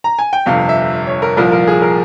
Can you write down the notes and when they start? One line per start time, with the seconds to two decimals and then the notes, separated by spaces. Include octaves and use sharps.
0.04 A#5
0.19 G#5
0.33 G5
0.46 G1 F2 C3 F5
0.69 E5
1.07 C#5
1.22 A#4
1.37 C2 A#2 F3 A#4
1.52 A#4
1.67 G#4
1.82 A#4